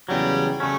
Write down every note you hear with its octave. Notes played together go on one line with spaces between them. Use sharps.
E2 C#3 F#3 G3
C#3 F#3 A3 C#4